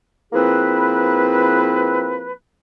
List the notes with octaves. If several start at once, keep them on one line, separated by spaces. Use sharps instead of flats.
F3 A#3 C4 E4 G#4 B4